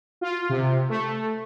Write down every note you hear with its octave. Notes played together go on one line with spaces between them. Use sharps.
F4
C3
A3